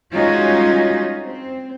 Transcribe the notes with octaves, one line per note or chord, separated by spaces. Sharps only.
G3 G#3 C#4 D#4 F4 F#4
C4